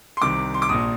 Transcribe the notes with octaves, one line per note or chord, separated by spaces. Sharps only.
C6
C2 C3 D#3 D6
C6
D6
A#1 A#2 D#6